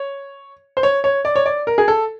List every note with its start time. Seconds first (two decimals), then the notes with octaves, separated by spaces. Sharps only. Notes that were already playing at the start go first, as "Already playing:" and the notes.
Already playing: C#5
0.77 C5
0.83 C#5
1.04 C#5
1.25 D5
1.36 C#5
1.46 D5
1.67 A#4
1.78 G#4
1.88 A4